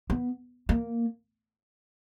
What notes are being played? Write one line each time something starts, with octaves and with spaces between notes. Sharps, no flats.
B3
A#3